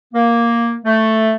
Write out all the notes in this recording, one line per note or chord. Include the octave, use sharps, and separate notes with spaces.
A#3
A3